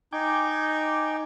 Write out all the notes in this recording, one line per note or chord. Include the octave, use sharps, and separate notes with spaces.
D#4 G5 G#5 D6